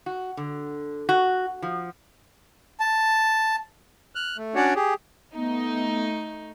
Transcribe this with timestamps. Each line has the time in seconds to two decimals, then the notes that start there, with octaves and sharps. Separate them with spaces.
0.06 F#4
0.37 D3
1.09 F#4
1.62 F3
2.80 A5
4.15 F6 F#6
4.37 A3
4.55 C#4 D4 F#4 C#5 D5
4.75 G4 G#4
5.35 A3 B3 D#4